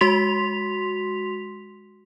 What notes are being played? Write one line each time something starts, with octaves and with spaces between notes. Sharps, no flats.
G#3 F#4 C6 B6 F7